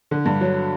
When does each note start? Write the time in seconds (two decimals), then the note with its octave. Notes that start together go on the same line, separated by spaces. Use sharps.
0.11 D3
0.26 G2
0.41 F#3